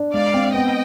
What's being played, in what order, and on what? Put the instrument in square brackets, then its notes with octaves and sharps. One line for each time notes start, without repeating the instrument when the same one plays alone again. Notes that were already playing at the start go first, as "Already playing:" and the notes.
Already playing: [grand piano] D4
[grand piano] G#3 [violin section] D5 F5
[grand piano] C4
[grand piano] B3 [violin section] D#5 G5